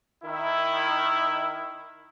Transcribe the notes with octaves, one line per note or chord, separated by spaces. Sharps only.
D#3 E4